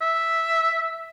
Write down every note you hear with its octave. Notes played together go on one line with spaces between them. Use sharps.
E5